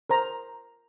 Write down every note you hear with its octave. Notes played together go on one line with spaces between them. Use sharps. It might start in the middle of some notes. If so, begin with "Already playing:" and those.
A#4 C5 A#5